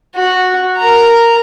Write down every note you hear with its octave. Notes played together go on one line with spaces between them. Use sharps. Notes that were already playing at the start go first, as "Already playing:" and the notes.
F#4
A#4 A#5